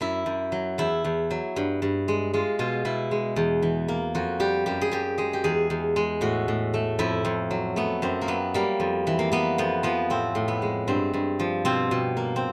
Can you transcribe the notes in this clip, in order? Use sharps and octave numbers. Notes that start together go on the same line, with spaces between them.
F#2 E4
F#2
F#3
E2 E4
E2
F#3
G2
G2
G#3
G#3 F4
B2 F4
B2 E4
G#3
E2
E3
A#3
F2 F#4
G3 G4
F#2 G4
G#4
F#2 G4
G#3 G#4
G4
E2 G#4
E2
G#3
A2 F#4
A2
A3
F2 E4
F2
F#3
A3 B3
F#2 C4
A#3
F#3 B3
G3 A#3
F2
E3
A#3
A#3 B3
F2 B3
F3 B3
A2 C4
A2
B3
G#3
G2 C4
G2
F3
B2 C4
B2
A#3
C4